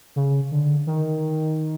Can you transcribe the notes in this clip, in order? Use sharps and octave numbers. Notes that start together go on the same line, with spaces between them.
C#3
D3
D#3